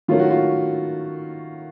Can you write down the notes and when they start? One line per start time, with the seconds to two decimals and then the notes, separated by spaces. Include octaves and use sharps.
0.08 D#3 F#3 A3 C#4 E4 F4
0.19 F#4
0.30 F4